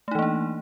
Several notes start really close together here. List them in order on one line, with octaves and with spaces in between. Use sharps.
A3 D#4 E3 A#3 D4